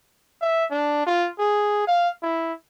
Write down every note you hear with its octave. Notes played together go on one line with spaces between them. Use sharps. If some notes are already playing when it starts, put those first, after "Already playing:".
E5
D4
F4
G#4
F5
E4